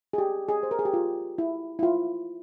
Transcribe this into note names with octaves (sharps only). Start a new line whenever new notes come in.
G#4
G4
G#4
C5
A#4
G#4
G4
F4
E4
E4
F4